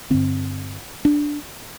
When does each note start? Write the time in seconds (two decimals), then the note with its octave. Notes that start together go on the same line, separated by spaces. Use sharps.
0.10 G2 D3 C4
1.05 D4